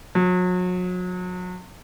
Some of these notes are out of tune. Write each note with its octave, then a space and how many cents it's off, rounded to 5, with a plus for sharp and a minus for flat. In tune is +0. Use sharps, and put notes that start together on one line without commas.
F#3 -35